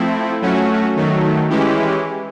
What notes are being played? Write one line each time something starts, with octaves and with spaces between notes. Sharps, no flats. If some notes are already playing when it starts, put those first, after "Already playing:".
Already playing: F3 A3 C4 E4
F#3 A3 C#4 F#4
D#3 F#3 A3
E3 G#3 C#4 E4 G4